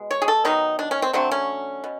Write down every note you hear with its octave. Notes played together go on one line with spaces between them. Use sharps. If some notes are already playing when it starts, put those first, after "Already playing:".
Already playing: B2 G#3
C#5
G#4
A4
D#3 F#3 B3 D#4
D4
C#4
C4
D3 F#3 A3 C4
C#4
B2